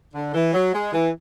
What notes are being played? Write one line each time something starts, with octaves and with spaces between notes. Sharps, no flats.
D3
E3
F#3
G#3
E3